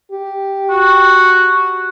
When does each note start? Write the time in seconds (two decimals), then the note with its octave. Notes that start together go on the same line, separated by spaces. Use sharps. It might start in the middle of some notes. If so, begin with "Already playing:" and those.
0.12 G4
0.70 F#4